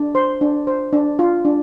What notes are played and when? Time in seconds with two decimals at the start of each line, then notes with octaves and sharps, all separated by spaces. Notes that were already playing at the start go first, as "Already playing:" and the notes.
Already playing: D4
0.15 C5 C6
0.41 D4
0.67 C5
0.93 D4
1.19 F4
1.45 D4